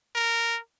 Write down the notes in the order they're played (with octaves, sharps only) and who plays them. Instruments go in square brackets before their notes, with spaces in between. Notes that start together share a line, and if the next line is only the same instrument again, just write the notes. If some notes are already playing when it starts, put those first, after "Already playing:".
[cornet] A#4